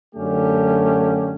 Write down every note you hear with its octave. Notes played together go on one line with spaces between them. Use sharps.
F#2 D3 A3 C#4 G4